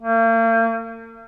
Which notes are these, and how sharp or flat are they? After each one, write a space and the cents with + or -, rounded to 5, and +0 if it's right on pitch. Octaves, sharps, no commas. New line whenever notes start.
A#3 -40